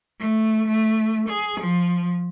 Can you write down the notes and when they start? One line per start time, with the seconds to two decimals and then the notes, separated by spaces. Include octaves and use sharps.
0.19 A3
0.67 A3
1.29 G#4
1.60 F3